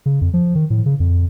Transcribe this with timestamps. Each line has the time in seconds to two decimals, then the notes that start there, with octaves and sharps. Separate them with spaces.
0.06 C#3
0.21 F2
0.34 F3
0.55 D#3
0.70 A2
0.86 C#3
1.00 F2